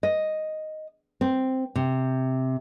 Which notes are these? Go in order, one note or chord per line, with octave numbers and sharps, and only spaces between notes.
D#5
C4
C3